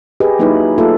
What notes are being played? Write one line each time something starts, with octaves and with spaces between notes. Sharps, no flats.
G4 G#4 B4 D#5
F#3 A#3 D#4 E4 B4
A3 A#3 F4 A4 E5